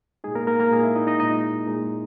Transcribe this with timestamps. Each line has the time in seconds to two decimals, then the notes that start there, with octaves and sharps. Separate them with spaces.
0.24 A#2 G#3 D#4 G#4
0.35 A#3 A#4
0.47 A#3 A#4
0.60 A#3 A#4
0.71 A#2 G#3 D#4 G#4
0.83 E4 E5
0.95 D#4 D#5
1.07 D#4 D#5
1.20 A#2 G#3 D#4 D#5
1.67 A#2 G#3 D#4